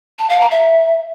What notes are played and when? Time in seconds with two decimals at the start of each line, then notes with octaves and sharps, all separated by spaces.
0.19 A5
0.29 F5
0.40 A#5
0.51 E5